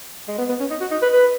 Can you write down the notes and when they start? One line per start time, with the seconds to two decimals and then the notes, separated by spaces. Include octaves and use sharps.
0.28 G#3
0.38 B3
0.49 B3
0.60 C#4
0.70 D#4
0.80 F#4
0.91 D#4
1.02 B4
1.13 B4